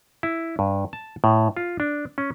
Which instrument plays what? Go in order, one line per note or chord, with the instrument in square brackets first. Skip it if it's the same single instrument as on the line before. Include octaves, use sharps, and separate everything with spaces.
[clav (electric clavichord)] E4
G2
A5
A2
F4
D4
C#4